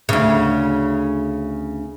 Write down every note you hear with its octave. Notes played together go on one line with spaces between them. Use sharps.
D2 C#3